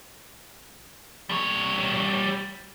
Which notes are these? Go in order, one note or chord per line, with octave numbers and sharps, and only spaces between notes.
G3 C#5